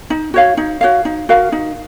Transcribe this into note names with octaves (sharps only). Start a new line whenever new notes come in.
D#4
F#4 C#5 F5
D#4
F#4 C#5 F5
D#4
F#4 A#4 F5
D#4